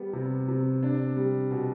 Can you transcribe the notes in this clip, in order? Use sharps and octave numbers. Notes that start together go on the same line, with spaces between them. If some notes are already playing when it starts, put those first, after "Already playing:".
Already playing: G3 B3
C3
C3
D4
G3
B2